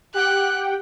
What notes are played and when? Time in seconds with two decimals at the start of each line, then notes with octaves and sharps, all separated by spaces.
0.14 G4 F#5 G5 F#6